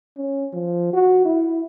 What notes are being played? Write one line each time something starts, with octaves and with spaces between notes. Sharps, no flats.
C#4
F3
F#4
E4